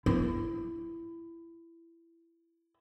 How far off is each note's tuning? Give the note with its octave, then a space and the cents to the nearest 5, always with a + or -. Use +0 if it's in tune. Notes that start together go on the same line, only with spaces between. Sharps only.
E4 +20